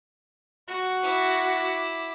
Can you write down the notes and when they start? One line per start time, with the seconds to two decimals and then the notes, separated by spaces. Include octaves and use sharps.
0.68 F#4
1.03 E4 D6